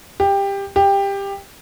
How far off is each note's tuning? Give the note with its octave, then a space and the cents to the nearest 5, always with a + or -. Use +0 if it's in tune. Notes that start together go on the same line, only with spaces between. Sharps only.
G4 +15
G4 +15